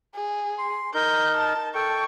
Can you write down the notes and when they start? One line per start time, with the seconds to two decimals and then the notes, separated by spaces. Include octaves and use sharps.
0.15 G#4
0.58 C6
0.94 D#4 A#4 G6
1.37 A5
1.75 A4 G5 C#6